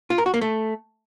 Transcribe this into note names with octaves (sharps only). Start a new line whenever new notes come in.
F4
A#4
F#4
A#3
A3